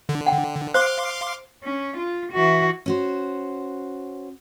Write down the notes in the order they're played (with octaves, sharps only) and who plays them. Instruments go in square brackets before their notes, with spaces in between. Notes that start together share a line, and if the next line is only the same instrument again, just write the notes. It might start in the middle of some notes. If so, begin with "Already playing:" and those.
[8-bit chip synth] D3
[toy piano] F#5 G5
[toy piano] C5 [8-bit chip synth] F5 C6 D6
[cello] C#4
F4
E3 F#4
[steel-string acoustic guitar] C#4 F#4 C5